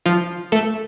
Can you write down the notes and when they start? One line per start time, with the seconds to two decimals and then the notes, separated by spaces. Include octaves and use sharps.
0.06 F3 F4
0.52 A3 A4